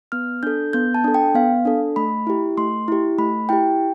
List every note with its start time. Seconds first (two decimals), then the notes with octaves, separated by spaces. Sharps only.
0.12 B3 F6
0.43 D4 A4 G6
0.73 B3 G6
0.94 A5
1.04 D4 A4
1.14 G5
1.35 B3 F5
1.65 D4 A4
1.96 A3 B5
2.27 E4 G4
2.58 A3 C6
2.88 E4 G4
3.19 A3 B5
3.49 E4 G4 G5